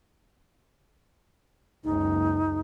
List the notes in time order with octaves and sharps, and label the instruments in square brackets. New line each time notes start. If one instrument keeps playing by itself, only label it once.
[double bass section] F#1 C#2 [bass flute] D#4